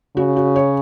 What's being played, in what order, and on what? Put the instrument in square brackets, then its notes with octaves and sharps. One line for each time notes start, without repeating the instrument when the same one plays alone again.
[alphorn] C#3 [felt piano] F#4
[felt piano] F#4
C#5